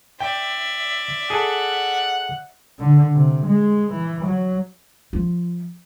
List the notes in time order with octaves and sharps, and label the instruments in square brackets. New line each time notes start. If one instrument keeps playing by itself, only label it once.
[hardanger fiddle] D5 E5 [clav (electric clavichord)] G5
[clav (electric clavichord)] G#4 A4 [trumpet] F#5
[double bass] D3
C3
G#3
E3
F#3
[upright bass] F3